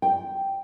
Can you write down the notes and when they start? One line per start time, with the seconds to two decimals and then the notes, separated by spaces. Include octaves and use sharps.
0.02 G5